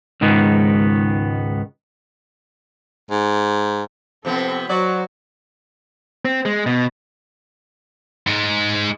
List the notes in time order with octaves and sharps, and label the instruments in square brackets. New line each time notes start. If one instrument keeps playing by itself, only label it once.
[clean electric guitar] C#2 G#2 D#3 B3
[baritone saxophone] G#2
[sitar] C3 F3 B3 [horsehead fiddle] C4 A4
[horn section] F#3 [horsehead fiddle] F#4 C5 [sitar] D5
[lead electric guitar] C4
G#3
B2
[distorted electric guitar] G#2 G#3